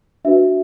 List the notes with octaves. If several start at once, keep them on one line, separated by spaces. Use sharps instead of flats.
D4 F#4 B4 E5